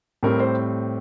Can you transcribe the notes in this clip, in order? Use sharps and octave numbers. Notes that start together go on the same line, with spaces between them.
A2 G3 C4 A#4
C5